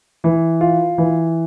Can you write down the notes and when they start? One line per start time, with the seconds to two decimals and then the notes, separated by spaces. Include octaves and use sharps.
0.24 E3
0.61 F4
0.98 E3